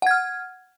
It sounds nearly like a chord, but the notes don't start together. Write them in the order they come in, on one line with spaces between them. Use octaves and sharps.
F#5 G#6 F6